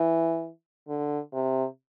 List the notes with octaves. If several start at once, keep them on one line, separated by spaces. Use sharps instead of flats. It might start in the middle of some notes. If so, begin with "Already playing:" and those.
Already playing: E3
D3
C3